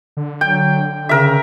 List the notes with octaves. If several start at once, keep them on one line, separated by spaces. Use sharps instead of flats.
D3
F#3 G5
C#3 A#4 E5